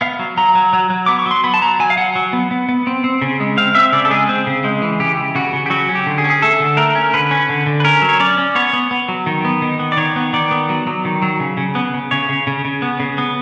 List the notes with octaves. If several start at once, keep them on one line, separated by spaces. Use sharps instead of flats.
B3 F5
F#3
F#3 A#5
F#3
F#3
F#3
B3 D6
C#6
F#3 C6
B3 B5
A5
F#3 A#5
F#3 G#5
F5
F#3 F#5
F#3
B3
B3
B3
C4
C4
C#3
G#3
C4 F5
C4 E5
C#3 D5
A4
G#3 G#4
C4
C#3
G#3
E3
C#3 G4
E3
C#3 F#4
C#3
G4
F#3 F#4
C#4
G4
D3
G#4
C#4
G#4
A3 A4
D3
A3 A#4
C#4
D3 B4
C#4
D3
D3
B4
C#4 A#4
F#3
C#5
C#4 D5
C#4
B3 C#5
B3
B3
F#3
D#3
B3
D#3
B3
D5
D#3 C#5
B3
D#3 D5
B3
F#3
F#3
D#3
F#3
C#3
C#3
B3
C#3
C#3 C#5
C#3
C#3
C#3
B3
C#3
B3